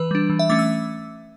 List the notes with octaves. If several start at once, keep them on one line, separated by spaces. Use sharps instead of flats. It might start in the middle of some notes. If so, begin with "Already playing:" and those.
Already playing: E3 B4
G3 D4
E3
E5
A3 C#4 D6
E6